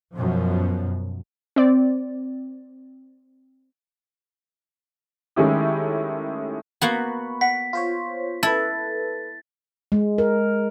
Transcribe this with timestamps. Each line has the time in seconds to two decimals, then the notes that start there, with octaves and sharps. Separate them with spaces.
0.13 F#2 B2 F3
1.56 C4 D5
5.36 D#3 G#3 A3 C#4 E4 G4
6.81 A#3 B3 F#4 B5 C#6 F#6
7.41 F#5 B6
7.73 F4 C5 C#5
8.43 E4 A4 B4 A6
9.92 G#3
10.18 A#4